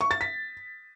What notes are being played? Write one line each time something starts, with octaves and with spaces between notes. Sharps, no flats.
C#6
A6
B6